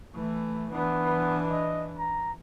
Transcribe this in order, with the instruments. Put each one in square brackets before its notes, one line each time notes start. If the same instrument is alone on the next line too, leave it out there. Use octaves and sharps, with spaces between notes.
[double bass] E3 A3
[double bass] E3 D4 [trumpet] B3
[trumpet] D#5
A#5